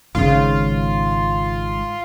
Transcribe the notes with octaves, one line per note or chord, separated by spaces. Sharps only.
G#1 G#2 C#3 F4